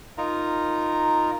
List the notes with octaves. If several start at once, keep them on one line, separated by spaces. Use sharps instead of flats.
D#4 F4 A#4 A#5